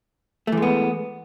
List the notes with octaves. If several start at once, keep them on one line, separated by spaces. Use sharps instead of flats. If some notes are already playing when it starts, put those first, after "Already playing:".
E3 G#3 A3 B3